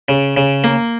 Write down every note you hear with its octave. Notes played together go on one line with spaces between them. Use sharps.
C#3
C#3
A#3